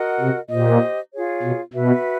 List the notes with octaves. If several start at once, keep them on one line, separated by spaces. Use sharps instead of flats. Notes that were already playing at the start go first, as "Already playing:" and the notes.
Already playing: F#4 A#4 D#5 F#5
C3
A#2 G4 C5 D#5
F4 G#4 C#5
B2
B2 F#4 B4 E5